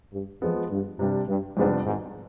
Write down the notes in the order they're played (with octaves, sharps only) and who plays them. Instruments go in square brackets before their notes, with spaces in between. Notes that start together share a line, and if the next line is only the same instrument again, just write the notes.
[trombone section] G2
[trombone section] F2 [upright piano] F3 G#3 B3
[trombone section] G2
[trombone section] G2 [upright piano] C3 G3 D4
[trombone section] G2
[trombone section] G#1 G#2 [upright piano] F2 C3 G3 B3 D4
[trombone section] G#1 G#2